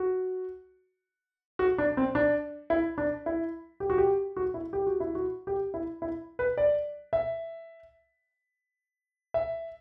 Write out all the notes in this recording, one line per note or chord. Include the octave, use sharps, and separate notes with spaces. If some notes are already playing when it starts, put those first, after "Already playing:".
Already playing: F#4
F#4
D4
C4
D4
E4
D4
E4
G4
F#4
G4
F#4
E4
G4
F#4
E4
F#4
G4
E4
E4
B4
D5
E5
E5